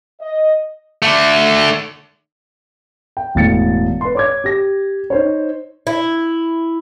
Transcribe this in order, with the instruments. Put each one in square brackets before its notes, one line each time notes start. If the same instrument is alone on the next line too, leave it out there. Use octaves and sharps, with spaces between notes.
[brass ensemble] D#5
[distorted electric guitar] D3 A3
[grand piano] G5
E1 A2 A6 C#7
B4 C6
C#5 D6 G#6
G4 A#6
D#4 C5 C#5
[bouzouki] E4